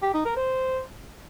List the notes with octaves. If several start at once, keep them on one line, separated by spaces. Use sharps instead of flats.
G4
D#4
A#4
C5